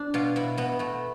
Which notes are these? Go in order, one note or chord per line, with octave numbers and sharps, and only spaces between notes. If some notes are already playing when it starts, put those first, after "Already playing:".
Already playing: D4
B2 F4
B2 E4
B2 B3
B2 A3